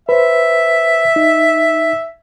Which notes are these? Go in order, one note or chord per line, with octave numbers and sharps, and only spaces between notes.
B4 C5 E5
D#4